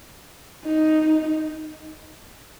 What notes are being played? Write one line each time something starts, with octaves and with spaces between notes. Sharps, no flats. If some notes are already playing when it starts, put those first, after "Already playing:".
D#4